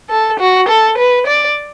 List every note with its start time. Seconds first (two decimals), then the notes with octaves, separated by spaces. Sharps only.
0.10 A4
0.40 F#4
0.69 A4
0.98 B4
1.27 D5